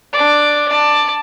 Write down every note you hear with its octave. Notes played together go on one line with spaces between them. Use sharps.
D4 D5
D5 A5